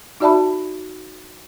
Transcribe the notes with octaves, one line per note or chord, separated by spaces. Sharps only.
D#4 F#4 D5 E5 A5 B5